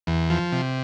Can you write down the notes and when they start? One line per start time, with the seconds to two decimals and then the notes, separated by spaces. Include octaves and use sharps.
0.07 E2
0.30 F3
0.52 C3